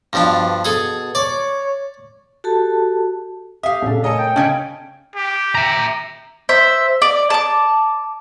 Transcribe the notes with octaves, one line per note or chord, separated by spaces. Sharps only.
G2 B2 F3 D4
B2 G#4 A4 G#5
C#5 D5 D6
F#4 G4 A4 A5
G4 E5 F5 D#6
A#1 C#3 A4
A3 A4 A#4 C#5 D#5 G#5
G5
C#3 C#4 D4 D#5 G#5 A5 G#6 D7
G4
E5 A#5
C5 E5
D5
A5 D6